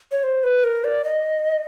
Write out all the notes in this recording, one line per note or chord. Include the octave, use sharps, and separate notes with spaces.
C#5
C5
B4
A#4
D5
D#5